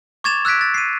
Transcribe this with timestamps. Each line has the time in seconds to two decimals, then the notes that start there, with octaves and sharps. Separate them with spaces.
0.24 C#6 D6 G#6 A6 E7 F7
0.45 E6 F#6 G#6 B6 D7
0.61 A6
0.74 C7 D#7